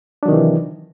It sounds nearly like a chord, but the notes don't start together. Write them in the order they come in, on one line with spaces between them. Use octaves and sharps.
D4 F#3 D#3 C3 E3